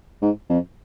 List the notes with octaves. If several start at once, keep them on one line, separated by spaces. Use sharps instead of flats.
G#2
F2